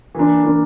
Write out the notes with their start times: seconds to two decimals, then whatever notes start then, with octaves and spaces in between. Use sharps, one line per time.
0.15 E3 A#3 D4
0.44 E3 A#3 D4